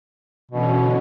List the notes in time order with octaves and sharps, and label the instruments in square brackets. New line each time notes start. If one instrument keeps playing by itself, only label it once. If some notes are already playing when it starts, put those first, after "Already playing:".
[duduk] B2 [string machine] D3 E3 C#4